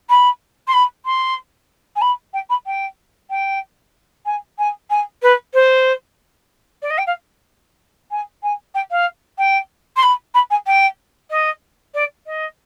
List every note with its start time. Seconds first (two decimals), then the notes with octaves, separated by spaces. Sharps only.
0.09 B5
0.67 C6
0.73 B5
1.05 C6
1.96 G#5
2.01 B5
2.33 G5
2.49 B5
2.66 G5
3.30 G5
4.25 G#5
4.58 G#5
4.90 G#5
5.22 B4
5.54 C5
6.82 D5
6.90 D#5
6.98 G5
7.06 F5
8.11 G#5
8.43 G#5
8.74 G5
8.91 F5
9.38 G5
9.96 C6
10.03 B5
10.34 B5
10.50 G#5
10.66 G5
11.30 D#5
11.94 D5
12.26 D#5